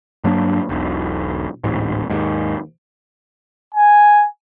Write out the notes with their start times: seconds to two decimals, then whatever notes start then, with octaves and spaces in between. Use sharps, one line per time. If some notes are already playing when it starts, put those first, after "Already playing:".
0.24 G2 F#3 A#3 D4
0.69 E1 B1
1.64 D1 A1 G#2
2.10 D#2 G#2
3.75 G#5